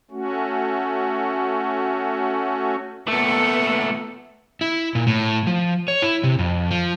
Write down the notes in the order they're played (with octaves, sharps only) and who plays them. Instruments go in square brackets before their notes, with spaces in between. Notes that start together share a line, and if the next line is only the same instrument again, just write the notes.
[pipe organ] A3 C#4 F#4
[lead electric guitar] A#2 A3 [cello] B3 A4
[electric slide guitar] E4
A#2
A2
F3
C#5
E4
C3
F2
F3